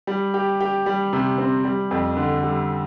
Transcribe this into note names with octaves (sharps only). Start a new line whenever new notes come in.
G3
G4
G4
G3
C3
C4
G3
F2
D3
G3